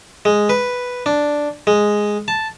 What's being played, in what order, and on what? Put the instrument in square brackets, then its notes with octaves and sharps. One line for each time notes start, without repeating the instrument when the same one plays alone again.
[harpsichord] G#3
B4
D4
G#3
A5